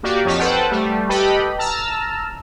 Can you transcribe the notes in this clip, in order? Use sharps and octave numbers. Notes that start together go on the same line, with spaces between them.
A#3 F#4 G4 D5
F2 D#4 C#5 A5 F6 B6
A4 B4 C5 F#5 G5 A5
G3 A3
G4 A4 B4 D#5 G5 B5
A5 A#5 E6 F6